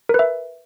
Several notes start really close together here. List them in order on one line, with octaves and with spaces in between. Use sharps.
A#4 B4 E5